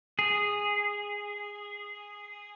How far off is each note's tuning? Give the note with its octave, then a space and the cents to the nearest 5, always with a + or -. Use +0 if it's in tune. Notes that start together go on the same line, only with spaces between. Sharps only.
G#4 -10